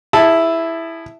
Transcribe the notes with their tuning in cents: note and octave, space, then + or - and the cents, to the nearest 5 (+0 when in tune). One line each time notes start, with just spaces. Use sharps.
E4 +0 G#4 -25 A5 +0